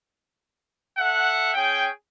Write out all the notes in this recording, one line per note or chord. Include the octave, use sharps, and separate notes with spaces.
A4 E5 F#5
C#4 G#4 G5